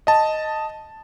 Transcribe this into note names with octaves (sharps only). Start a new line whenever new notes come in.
D#5 A5